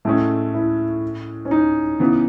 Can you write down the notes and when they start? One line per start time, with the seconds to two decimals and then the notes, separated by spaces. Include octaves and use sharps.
0.05 A2 G#3 A3 C#4
0.54 E4
1.45 C#4
1.51 D#4
2.00 C#3 E3 B3